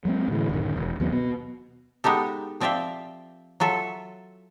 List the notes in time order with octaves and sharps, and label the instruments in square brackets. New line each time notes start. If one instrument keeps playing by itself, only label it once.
[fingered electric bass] F#3 G#3 A#3 C4
A2 D3 E3
D1 F#2 D#3
E1
D#2 F#3 B3 C4
B2 B3
[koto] G#3 B3 D#4 G4 A4
F3 C4 D5 E5 F5 G5
F#3 F4 A4 E5